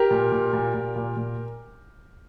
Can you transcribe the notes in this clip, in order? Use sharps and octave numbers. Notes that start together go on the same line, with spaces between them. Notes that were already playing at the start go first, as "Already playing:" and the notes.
Already playing: G4 A#4
A#2
A#2
A#2
A#2
A#2
A#2